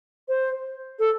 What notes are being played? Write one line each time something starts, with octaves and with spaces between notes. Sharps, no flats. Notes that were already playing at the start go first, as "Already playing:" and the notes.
C5
A4